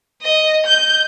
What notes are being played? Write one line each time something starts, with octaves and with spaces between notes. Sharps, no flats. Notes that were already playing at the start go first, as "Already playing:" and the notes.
D#5
G6